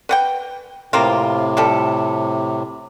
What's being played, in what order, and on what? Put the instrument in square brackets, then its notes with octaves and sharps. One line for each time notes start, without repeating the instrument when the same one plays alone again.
[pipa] B4 F#5 G5
[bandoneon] A2 C3 [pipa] A#3 C4 F4
[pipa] F3 G3 A4